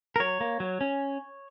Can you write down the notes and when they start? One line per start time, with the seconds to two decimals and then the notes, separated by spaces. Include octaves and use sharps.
0.16 A#4
0.20 F#3 C#5
0.41 A#3
0.60 F#3
0.81 C#4